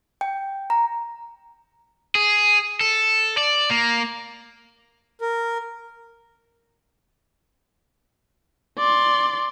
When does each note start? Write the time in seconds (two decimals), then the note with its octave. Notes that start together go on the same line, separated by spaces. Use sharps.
0.21 G5
0.70 A#5
2.15 G#4
2.81 A4
3.37 D5
3.71 A#3
5.21 A#4
8.78 D5 C6